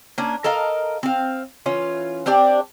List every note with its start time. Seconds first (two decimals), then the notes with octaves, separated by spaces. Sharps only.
0.18 A#3 C#4 D4
0.44 A4 A#4 D#5 F5
1.03 C4 F5
1.66 E3 C#4 F4
2.26 C4 D4 G4 D5